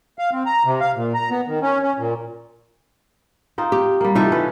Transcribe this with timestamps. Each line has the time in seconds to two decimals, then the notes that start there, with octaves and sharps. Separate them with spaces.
0.19 F5
0.32 C4
0.46 A#5
0.65 C3
0.81 F5
0.95 A#2
1.14 A#5
1.30 B3
1.48 D#3
1.62 C#4
1.83 C#4
1.99 A#2
3.58 C4 D#4 F4
3.72 G4
4.01 G3 A#3
4.15 C3 E3 D#4 F4 A4 E5
4.32 C#4 B4